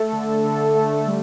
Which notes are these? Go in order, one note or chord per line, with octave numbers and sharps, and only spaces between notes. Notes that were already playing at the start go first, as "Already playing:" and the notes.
Already playing: A3 A4
D3
D3
A3
G3